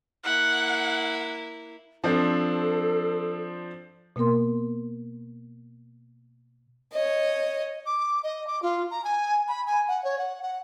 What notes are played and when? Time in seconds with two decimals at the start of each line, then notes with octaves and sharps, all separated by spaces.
0.24 A#3 E4 F#5
2.04 F3 C4 D4 A4
4.16 B2 A#3 B3 A#4 C6
6.92 C#5 D#5
7.86 D6
8.24 D#5
8.47 D6
8.62 F4
8.91 A#5
9.04 G#5
9.48 B5
9.67 G#5
9.88 F#5
10.04 C#5
10.19 F#5
10.42 F#5